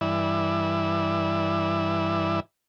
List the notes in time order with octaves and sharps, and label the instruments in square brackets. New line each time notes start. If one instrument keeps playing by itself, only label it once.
[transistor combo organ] G2 E3 E4 D5 E5